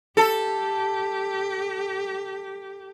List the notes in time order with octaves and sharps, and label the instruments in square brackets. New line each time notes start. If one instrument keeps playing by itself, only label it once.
[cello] G4 [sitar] A4